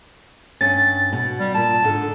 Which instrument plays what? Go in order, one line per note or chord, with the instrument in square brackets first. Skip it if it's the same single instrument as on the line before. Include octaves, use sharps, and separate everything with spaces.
[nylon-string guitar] G2 C#4 [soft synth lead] A6
[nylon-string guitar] B2
[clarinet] G3
[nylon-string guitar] A#2 [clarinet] A5
[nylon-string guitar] G#2 D3